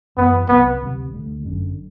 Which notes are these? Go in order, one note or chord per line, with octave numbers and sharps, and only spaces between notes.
F#2 E3 G3 B3
C2 C3 F#3 B3
D2 C3 G3
D2 D3 A3
G1 F#2 D3